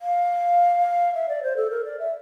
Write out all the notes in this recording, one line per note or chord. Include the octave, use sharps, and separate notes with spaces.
F5
E5
D5
C5
A4
A#4
D5
E5